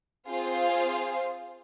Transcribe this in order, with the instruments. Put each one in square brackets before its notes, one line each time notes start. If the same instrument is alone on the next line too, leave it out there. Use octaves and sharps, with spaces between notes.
[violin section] C4 F4 G#4 C5 F5